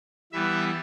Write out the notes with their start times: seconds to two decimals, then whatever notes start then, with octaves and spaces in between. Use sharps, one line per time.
0.32 E3 G3 B3 E5